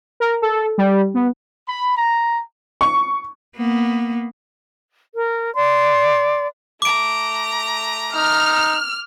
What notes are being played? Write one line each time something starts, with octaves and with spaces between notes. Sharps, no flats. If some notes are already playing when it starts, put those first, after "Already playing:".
A#4
A4
G3
B3
B5
A#5
C#6
A#3 B3
A#4
D5 C6
A3 A#5 D6 D7
D#4 F6